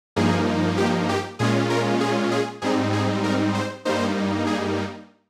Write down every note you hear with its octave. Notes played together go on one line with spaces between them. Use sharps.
G2 F3 A#3 D#4 G#4
G4
G4
A#2 G#3 C#4 F4 G#4
A#4
G#4
G#4
G#2 G3 C4 D#4 G#4
G#4
A#4
C5
G2 G3 A#3 D#4 C5
G#4